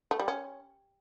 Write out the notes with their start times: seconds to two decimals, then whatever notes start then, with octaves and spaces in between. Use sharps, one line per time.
0.11 A3
0.19 G3
0.28 C#4